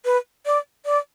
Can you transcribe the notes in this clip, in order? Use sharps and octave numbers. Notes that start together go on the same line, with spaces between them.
B4
D5
D5